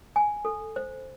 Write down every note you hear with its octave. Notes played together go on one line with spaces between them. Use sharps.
G#5
A4
C5